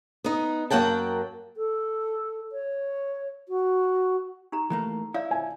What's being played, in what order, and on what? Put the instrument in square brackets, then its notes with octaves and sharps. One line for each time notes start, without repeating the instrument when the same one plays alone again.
[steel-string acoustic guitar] B3 D#4
F#2 F#3 A#3 F#5 G5 A5
[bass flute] A4
C#5
F#4
[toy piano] D#4 G4 A#5
[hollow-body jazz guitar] E3 A3 A#3 [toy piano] A#5
[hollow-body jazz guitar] E4 [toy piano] C#5 D5 F5
[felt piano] G#5